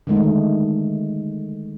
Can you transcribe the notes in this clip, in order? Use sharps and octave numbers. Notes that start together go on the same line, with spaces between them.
D3 D#3 G#3 A3 D#4